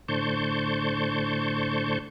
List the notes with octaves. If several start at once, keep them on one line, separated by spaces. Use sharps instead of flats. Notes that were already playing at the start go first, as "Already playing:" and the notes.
A2 D3 C5 A5 C#6 G6